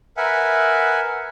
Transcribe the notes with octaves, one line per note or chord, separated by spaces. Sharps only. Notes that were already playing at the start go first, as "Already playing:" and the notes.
A#4 B4 E5 F#5 G#5